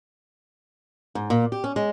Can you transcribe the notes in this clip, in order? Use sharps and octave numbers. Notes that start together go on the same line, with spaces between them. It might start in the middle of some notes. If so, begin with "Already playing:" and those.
G#2
A#2
G4
C#4
G#3